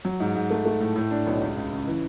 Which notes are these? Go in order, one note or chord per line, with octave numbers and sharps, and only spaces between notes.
F#3
G#2
G#2
A3
A3
A2
A2
D4
B1
C#2
C#2
C#3
E3